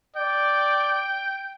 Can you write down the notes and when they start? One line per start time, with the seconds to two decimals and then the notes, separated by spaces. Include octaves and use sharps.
0.16 D5 G5